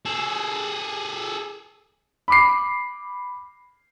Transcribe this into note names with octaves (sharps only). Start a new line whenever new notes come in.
G#4 A4
B5 D6 C7